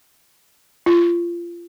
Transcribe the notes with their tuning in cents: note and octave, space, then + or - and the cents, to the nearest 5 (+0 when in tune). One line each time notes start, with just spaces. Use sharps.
F4 -25